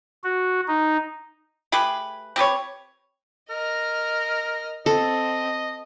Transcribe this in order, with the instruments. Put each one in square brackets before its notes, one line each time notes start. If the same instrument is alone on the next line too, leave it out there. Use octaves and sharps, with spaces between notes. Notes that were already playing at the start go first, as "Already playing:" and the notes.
[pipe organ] F#4
D#4
[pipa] A3 G4 G#4 B4
C4 G4 B4 C#5
[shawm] A#4 [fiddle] D#5 F6
[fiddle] C4 [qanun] A4 [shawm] D#5